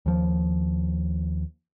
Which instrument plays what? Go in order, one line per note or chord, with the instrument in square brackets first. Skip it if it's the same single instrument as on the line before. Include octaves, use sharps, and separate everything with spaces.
[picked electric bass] D#2 F3